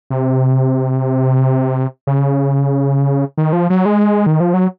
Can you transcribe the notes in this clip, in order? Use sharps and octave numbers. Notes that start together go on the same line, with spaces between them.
C3
C#3
D#3
F3
F#3
G#3
D#3
F3
F#3